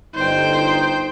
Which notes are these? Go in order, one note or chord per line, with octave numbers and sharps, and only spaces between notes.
G1 D#4 C5 G5